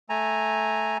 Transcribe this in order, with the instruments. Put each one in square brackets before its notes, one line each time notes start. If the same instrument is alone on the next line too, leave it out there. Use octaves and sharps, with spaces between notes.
[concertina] A3 G#5 A#5